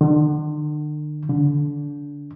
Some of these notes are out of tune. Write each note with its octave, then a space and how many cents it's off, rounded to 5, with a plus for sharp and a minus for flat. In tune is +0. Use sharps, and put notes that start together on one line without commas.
D3 +40
D3 -20